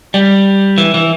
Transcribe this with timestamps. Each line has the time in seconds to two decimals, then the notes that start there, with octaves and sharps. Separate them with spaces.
0.14 G3
0.78 E3
0.94 E3